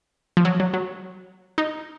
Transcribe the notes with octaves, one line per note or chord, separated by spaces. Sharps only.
F3
F#3
F#3
F#3
D#4